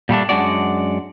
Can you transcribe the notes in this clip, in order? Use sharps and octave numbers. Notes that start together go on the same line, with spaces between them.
A#2 G3 A3 D4
F#2 G#3 D4 F#4 D5